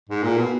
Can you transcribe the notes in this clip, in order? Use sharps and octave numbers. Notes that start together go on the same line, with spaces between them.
G#2
A#2
B2